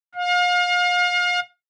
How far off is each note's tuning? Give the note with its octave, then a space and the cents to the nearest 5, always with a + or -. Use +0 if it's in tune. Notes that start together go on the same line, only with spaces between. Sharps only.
F5 +35